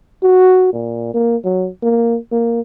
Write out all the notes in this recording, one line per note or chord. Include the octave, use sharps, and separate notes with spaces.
F#4
A#2
A#3
F#3
A#3
A#3